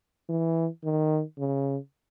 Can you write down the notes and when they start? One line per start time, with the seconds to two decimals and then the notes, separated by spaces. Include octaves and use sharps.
0.29 E3
0.84 D#3
1.39 C#3